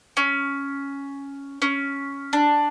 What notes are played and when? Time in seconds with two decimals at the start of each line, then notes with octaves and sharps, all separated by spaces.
0.17 C#4
1.62 C#4
2.33 D4